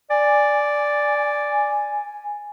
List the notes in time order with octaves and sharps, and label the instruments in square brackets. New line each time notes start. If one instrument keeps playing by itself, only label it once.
[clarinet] D5 [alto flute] G#5